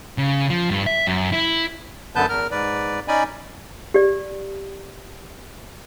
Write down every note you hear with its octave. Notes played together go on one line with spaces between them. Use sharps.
C#3
F3
G2
E5
F#2
E4
F#2 D3 B3 B4 A5 G6
E2 A#4 F6
G#2 B4 D5
C#4 D#4 D5 D#5 G#5 B5
G4 D5